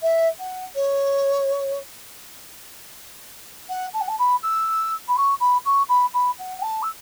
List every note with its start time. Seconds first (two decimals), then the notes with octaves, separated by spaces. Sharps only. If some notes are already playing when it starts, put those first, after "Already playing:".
0.02 E5
0.39 F#5
0.75 C#5
3.69 F#5
3.93 A5
4.01 F#5
4.08 A5
4.18 B5
4.42 E6
5.08 B5
5.16 C#6
5.40 B5
5.64 C#6
5.88 B5
6.13 B5
6.38 F#5
6.58 F#5
6.62 A5
6.82 E6